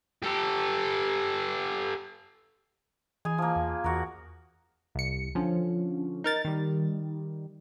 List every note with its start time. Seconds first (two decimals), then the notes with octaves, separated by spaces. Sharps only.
0.23 G4 A4
3.25 E3 G#4 G#5
3.38 F3 A#3
3.56 E2
3.84 E2 F#4 A#4 F6
4.95 C2 C#7
5.35 D3 F3 C#4
6.24 D#4 A#4 A6
6.45 D#3 G3